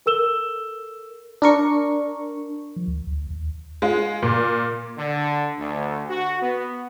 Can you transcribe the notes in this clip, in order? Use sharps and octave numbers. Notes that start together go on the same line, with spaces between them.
A4 A#4 E6 E7 G7
D4 A#4 C#6
F3
D2
D2
D#2
G#3 F4
A#2
D3
D2
F#4
B3